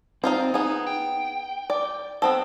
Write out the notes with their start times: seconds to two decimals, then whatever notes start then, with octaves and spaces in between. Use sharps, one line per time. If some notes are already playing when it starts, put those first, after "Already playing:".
0.24 C4 D#4 F4 C5
0.54 B3 D#4 G#4
0.87 G5
1.70 D5
2.22 B3 C4 A4